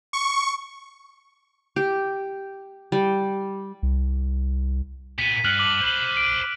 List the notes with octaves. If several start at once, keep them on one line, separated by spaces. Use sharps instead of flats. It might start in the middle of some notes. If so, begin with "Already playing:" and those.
C#6
G4
G3
C2
A#2 B3 B6 D#7
G2 F6 F#6 F#7
D6 F#7
C5 B5
D7